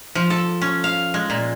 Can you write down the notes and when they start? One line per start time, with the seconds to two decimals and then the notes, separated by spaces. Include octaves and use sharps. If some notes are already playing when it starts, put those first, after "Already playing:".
0.15 F3
0.30 A4
0.62 C#4
0.84 F5
1.14 G#3
1.30 A#2